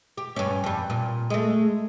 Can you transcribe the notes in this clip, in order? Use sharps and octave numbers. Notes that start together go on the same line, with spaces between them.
G4
G2 C#4
F2 G3
A#2
G#3 A3